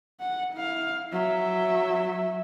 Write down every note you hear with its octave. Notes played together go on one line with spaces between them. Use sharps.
F#5
E4 F5
F#3 E5